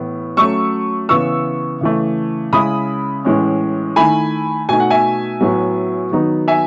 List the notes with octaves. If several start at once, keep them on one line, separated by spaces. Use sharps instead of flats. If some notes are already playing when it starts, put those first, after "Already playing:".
Already playing: A2 E3 B3 E4
F#3 A3 C#4 C#6 E6
C#3 E3 B3 C#6 E6
C#3 E3 A3
C#3 G#3 C#4 E4 B5 D#6
A2 E3 G#3 C#4
D#3 A3 E4 G#5 B5
B2 A3 D#4 G#5
F#5
E5 G#5
A2 F#3 B3
D#3 F#3 B3 D#4
E5 G#5